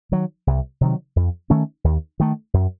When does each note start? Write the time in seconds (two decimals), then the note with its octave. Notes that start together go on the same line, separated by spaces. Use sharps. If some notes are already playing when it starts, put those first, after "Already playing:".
0.12 D#3 F#3
0.47 C2
0.81 C3 D#3 F#3
1.16 F2
1.50 D#3 A3 C#4
1.84 D#2
2.20 D#3 A3
2.54 F#2